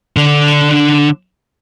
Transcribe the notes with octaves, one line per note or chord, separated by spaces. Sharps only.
D3 D4